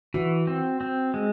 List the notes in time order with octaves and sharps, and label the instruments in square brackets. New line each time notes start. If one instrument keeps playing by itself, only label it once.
[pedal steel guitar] E3 [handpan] F#4
[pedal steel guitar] C4
C4
G#3